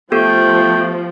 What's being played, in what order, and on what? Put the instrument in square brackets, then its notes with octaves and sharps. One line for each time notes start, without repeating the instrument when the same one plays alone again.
[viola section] F3 [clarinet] A3 [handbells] B3 G4 A4 [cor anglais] G5